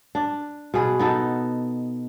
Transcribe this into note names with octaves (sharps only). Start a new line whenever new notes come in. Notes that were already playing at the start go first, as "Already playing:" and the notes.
D4
B2 G#4 B4
B3 D#4 A4